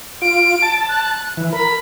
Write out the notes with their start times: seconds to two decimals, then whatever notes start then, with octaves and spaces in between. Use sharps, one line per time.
0.22 F4 D7
0.62 A5
0.89 F#6
1.37 E3
1.53 A#4 B5